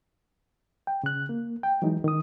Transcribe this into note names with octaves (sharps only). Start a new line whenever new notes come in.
G5
C#3 F#6
A#3
G5
E3 F#3 G#3 D#4
D#3 D#6